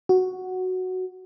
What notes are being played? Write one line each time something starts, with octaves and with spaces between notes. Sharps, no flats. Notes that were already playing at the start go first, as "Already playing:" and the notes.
F#4